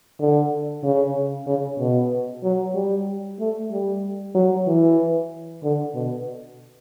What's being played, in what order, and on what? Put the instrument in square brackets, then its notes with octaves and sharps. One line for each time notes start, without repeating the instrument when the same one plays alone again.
[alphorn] D3
C#3
C#3
B2
F#3
G3
A3
G3
F#3
E3
D3
B2